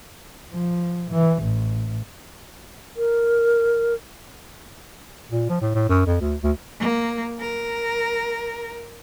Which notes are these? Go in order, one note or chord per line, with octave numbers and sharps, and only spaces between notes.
F3
E3
A1
A#4
A#2
F3
A2
A2
F#2
F2
D2
D2
A#3
A#4